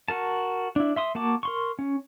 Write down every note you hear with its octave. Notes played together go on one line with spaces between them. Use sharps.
F#4 A#4 A5
D4 E4
E5 C6 D#6
A#3 F#4 A5 D6
A#4 C6 C#6
C#4